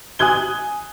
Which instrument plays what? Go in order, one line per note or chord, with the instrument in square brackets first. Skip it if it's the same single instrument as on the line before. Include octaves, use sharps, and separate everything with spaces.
[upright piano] G#5 D#6 F#6 G#6 G7